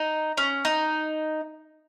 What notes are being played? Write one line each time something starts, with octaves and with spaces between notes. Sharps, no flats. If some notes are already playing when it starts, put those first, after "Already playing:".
Already playing: D#4
C#4
D#4